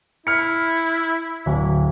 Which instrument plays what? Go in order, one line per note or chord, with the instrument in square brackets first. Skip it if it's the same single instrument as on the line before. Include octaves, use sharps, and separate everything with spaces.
[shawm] E4 [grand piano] F6 C#7
[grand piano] D1